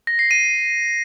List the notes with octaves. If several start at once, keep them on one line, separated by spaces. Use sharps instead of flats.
A#6
C7
D#7